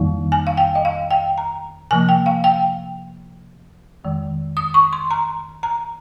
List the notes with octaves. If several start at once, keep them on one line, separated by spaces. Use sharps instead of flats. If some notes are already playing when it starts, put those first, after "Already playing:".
Already playing: F2 D#3 G3 A#3 D#4
G#5
F5
G5
D#5
F5
G5
A#5
C3 F3 A#3 G#5
G5
F5
G5
F2 D#3 G#3
D#6
C#6
C6
A#5
A#5